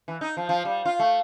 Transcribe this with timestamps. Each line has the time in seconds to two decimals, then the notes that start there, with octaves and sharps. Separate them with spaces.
0.08 E3
0.21 D#4
0.37 F3
0.49 F3
0.65 G3
0.85 F4
0.99 A3